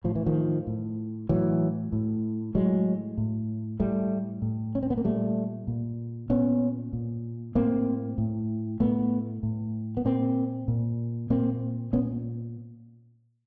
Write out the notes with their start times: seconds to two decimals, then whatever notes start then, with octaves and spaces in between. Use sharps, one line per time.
0.04 A2 F3
0.15 E3
0.26 D#3 F3
0.67 A2
1.29 A2 E3 F#3
1.92 A2
2.55 A2 F#3 G#3
3.18 A2
3.80 A2 G3 A3
4.42 A2
4.75 C#4
4.83 C4
4.90 B3
4.97 A#3
5.05 A#2 G3 A3
5.67 A#2
6.30 A#2 B3 C#4
6.93 A#2
7.55 A2 A#3 C4
8.18 A2
8.80 A2 A3 B3
9.43 A2
9.97 B3
10.05 A#2 A#3 C4
10.68 A#2
11.30 A#2 A#3 C4
11.93 A#2 B3 C#4